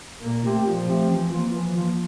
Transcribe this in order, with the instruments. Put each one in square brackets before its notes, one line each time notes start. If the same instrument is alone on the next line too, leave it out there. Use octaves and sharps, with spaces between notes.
[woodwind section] A#2 [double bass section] A#3
[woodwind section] A3 C4 G4
[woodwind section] A#2 [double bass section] F3
[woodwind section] A3 C4 G4
E3
A#3 F4
[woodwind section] E3 [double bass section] F3
[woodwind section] A#3 F4